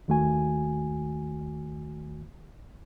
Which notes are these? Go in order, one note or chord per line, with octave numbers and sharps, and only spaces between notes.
D#2 D#3 A3 F#4 G#5